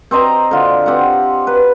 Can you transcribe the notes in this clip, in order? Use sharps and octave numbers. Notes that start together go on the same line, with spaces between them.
C4 C5 D#5 A#5
D3 F4
C4 G4 F#5
B4